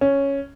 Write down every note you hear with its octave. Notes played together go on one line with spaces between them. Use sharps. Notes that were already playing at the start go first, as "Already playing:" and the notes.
C#4